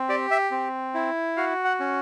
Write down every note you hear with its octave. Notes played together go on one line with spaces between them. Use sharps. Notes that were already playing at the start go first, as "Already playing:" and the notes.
Already playing: C4
G4 D5
E5
C4
E4
F#4 F5
F#5
C#4